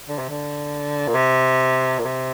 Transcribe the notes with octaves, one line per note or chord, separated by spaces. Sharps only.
D3
C3
D3
A#2
C3
A#2
C3